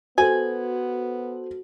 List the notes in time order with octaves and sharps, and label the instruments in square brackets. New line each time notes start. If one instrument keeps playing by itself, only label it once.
[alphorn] B3 [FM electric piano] F#4 [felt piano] A4 C5 [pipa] G#5